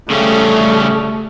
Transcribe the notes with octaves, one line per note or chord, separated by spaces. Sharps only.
C#3 G3 A3 C#4